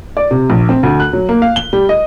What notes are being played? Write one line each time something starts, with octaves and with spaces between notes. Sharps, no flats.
D5
C3
A#1
C4
D2
F#6
F#3
A#3
F5
G7
G3
D#5